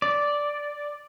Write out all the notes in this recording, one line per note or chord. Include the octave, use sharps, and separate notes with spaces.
D5